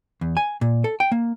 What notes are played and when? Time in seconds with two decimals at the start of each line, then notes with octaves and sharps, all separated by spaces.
0.21 E2
0.37 G#5
0.61 A#2
0.84 A4
1.00 G5
1.12 A#3